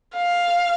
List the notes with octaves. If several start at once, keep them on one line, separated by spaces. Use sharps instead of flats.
F5